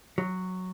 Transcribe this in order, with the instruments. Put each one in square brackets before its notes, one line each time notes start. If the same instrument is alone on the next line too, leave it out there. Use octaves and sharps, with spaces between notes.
[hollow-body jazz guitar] F#3